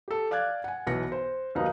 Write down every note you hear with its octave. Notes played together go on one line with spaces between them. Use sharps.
G4 A4
D5 F5 D6 F#6 G#6 A6
F#5 G#5
B1 E3 B3 A#6 C#7
C5
D#2 F#3 B3 D#4 F5